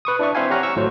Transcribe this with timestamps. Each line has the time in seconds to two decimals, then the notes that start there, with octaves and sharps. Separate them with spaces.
0.05 B4 C#6 D#6
0.19 D4 E4 D5 E5 C#6
0.35 C4 C5 E5 F5 G#5
0.50 G4 C#5 F#5 A#5 C#6 F6
0.63 C#6 E6
0.76 G#1 A2 F#3 C5